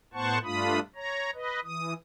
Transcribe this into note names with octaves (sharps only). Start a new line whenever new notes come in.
A2 B3 C5 F#5 A5 C#6
G2 A3 D4 F4 B5 D#6
C#5 A#5
B4 D#5
E3 D#6